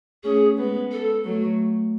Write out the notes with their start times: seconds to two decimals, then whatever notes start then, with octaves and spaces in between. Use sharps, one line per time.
0.23 A3 C#4 G#4
0.57 G#3 B3
0.92 A4
1.24 F#3 A3